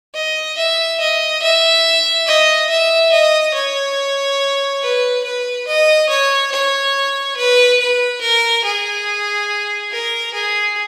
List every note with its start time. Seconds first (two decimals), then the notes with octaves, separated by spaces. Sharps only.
0.14 D#5
0.58 E5
1.00 D#5
1.43 E5
2.27 D#5
2.70 E5
3.12 D#5
3.54 C#5
4.82 B4
5.24 B4
5.68 D#5
6.09 C#5
6.52 C#5
7.37 B4
7.80 B4
8.21 A#4
8.65 G#4
9.91 A#4
10.34 G#4